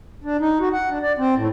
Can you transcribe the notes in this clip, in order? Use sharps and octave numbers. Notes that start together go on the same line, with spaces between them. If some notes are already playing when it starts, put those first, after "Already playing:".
D4
D#4
F#4
F#5
D4
D5
C4
A2